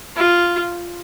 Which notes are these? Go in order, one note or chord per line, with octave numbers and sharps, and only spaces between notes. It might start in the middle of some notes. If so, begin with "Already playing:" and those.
F4